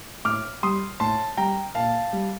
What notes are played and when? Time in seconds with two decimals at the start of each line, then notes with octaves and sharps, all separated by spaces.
0.25 A2 D6 F6
0.63 G3 C6 D#6
1.00 A2 A5 C6
1.37 G3 G5 A#5
1.75 A#2 F5 A5
2.13 G3